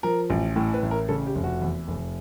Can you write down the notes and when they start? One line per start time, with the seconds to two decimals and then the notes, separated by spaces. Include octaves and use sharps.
0.03 F3 A#4
0.30 A1
0.56 A2
0.74 B4
0.83 A1
0.91 A#4
1.09 C#3 A4
1.27 G4
1.35 F1
1.44 F#4
1.62 E2
1.88 F1